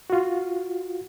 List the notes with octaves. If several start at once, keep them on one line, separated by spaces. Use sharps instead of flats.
F4 F#4